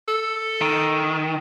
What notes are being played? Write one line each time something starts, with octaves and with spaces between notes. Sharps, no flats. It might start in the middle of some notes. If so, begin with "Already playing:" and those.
A4
D#3